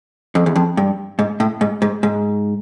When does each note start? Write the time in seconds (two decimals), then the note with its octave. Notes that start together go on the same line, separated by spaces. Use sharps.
0.35 F2
0.46 E2
0.56 F2
0.77 G2
1.19 G#2
1.40 A2
1.61 G#2
1.82 G#2
2.03 G#2